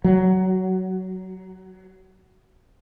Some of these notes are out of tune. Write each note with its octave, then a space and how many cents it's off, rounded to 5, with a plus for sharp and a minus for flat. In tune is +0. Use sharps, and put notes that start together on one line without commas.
F#3 +15